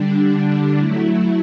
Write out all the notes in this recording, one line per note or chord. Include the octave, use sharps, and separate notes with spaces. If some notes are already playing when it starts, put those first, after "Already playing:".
Already playing: D3 G3 D4
F#3 A3 E4